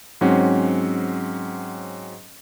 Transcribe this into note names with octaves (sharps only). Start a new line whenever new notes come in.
G#2 F#3 C4 C#4 F#5